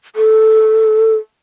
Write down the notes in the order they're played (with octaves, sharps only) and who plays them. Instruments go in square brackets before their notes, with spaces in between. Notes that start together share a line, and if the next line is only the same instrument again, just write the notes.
[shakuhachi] A4